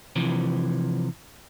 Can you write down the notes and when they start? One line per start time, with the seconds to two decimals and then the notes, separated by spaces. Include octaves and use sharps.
0.16 C3 E3 F3